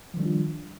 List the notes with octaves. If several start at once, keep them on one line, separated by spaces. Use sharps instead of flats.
D#3 F3 G3 D4 F4